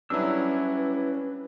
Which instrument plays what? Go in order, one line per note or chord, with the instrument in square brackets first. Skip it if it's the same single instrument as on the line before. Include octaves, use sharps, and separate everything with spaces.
[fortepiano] F#3 D4 [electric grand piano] G3 E4 [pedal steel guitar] C#4 E6 [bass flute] B4